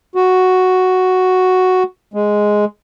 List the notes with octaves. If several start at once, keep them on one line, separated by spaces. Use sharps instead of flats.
F#4
G#3